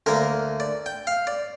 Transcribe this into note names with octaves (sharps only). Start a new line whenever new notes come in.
D2 D3 A#3 A#4
D5
G5
F5
D5